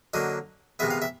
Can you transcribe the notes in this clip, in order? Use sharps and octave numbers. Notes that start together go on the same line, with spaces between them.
D3 F#3 A#3 D#5
C3 D#3 G#3 B3 E5
F5
E5